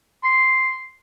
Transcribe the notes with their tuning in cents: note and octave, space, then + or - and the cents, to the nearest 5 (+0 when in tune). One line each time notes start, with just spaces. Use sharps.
C6 +0